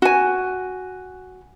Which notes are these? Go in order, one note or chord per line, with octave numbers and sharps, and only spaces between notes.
F#4 G#5